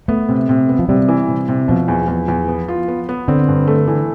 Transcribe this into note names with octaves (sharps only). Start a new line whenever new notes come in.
A3 B3
C3
C3
B3
F3
C3 G3
E3
C3
C3
B2 F3
E2
E2
E2
B3
F4
B3
B3
D3 C4
G2
A3
E3